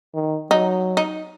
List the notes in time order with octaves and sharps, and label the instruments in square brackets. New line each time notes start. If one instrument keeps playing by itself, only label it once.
[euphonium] D#3
[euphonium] F#3 [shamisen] D#4
[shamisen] D#4